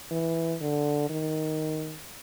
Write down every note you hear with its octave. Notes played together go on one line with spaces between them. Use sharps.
E3
D3
D#3